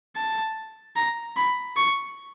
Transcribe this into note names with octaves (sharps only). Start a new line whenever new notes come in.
A5
A#5
B5
C#6